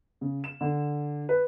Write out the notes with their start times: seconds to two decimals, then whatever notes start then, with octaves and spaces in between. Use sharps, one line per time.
0.21 C#3
0.44 E7
0.61 D3
1.29 B4